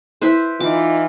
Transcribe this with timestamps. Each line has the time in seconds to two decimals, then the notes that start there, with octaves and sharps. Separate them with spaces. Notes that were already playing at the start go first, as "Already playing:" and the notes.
0.21 E4 B4 C5
0.60 E3 D#4 F4 D6